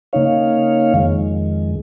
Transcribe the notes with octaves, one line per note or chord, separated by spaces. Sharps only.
C#3 A#3 D#4 C#5 F5
F2 D#3 G#3